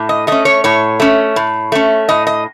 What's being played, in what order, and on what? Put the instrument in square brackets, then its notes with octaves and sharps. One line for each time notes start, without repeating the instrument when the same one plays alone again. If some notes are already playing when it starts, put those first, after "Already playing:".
Already playing: [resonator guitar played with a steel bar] A2
D#5
A3 C#4 D#5
C#5
A2 C#5
A3 C#4
A2
A3 C#4
A2 D#5
D#5